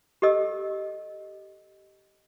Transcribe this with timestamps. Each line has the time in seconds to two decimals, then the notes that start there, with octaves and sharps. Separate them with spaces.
0.22 G4 A4 D#5 E6